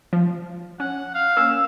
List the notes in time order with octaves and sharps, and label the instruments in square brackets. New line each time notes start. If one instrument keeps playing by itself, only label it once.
[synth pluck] F3
[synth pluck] C#4 [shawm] F#5
[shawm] F5
[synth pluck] A#3 C#4 [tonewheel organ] E6